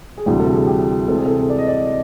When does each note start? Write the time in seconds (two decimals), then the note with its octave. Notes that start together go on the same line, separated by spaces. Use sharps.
0.18 G#4
0.26 D2 C3 E3 G3 G4
0.40 A4
0.54 G#4
0.67 G4
1.08 C3 E3 G#3 C4 A4
1.17 G#4
1.26 A4
1.49 D5
1.58 D#5
1.67 D5